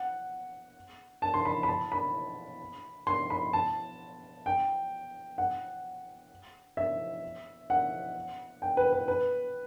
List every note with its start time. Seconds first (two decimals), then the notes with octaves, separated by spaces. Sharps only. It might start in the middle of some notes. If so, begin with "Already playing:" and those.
Already playing: F#5
1.22 A5
1.34 C6
1.45 B5
1.63 B5
1.68 A5
1.92 B5
3.07 C6
3.30 B5
3.53 A5
4.46 G5
5.38 F#5
6.77 E5
7.70 F#5
8.62 G5
8.77 B4
8.93 B4
9.08 B4